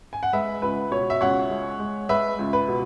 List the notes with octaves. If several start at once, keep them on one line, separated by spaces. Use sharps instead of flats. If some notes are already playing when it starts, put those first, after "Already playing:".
G#5
F#5
G#3 B4 E5
C#2 B4
B2 C#5
E5
C#2 C#5 F#5
G#3
G#3
G#3 B4 E5
C#2
B4
B2